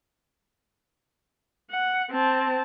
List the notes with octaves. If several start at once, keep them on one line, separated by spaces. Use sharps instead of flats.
F#5
C4 A5